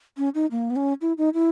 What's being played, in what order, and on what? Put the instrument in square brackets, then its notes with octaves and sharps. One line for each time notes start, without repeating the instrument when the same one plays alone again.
[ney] C#4
D#4
A#3
B3
C#4
E4
D#4
E4